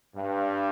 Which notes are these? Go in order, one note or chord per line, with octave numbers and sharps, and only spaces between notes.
G2